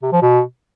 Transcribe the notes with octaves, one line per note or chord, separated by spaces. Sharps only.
C3
F3
B2